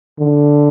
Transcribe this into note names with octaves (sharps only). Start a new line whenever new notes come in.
D3